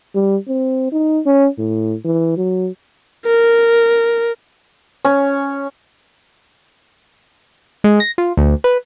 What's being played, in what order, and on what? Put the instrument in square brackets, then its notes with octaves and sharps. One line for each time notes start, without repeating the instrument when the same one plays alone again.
[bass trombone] G3
C4
D#4
C#4
A2
E3
F#3
[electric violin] A#4
[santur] C#4
[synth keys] G#3
A#6
F4
D2
B4